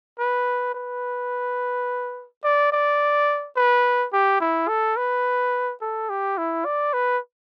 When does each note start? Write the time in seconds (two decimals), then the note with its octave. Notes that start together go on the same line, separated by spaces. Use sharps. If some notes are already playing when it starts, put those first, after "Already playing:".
0.19 B4
0.75 B4
2.44 D5
2.72 D5
3.56 B4
4.13 G4
4.40 E4
4.68 A4
4.97 B4
5.82 A4
6.10 G4
6.38 E4
6.65 D5
6.94 B4